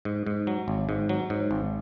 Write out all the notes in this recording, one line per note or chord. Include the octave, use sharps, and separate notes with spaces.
G#2
G#2
F#3
G#1
G#2
F#3
G#2
G#1